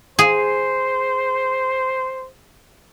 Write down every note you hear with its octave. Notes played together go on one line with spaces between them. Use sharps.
G#4 C5